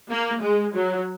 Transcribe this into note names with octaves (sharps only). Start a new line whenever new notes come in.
A#3
G#3
F#3